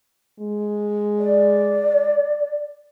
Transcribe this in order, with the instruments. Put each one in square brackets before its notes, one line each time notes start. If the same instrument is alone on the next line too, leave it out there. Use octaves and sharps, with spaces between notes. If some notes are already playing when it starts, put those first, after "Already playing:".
[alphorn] G#3
[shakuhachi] D5